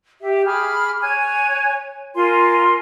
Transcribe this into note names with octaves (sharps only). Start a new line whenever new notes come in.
G4 E5
G#4 B5 D6 F6
C#5 G#5 F#6 G#6
F4 A#4 G#5 C6